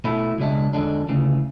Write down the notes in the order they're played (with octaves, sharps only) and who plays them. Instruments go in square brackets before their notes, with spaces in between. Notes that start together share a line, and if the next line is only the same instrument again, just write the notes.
[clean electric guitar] B2 A3 E4
C#2 B2 G#3 D4
E2 D3 G#3 D4
D2 C#3 E3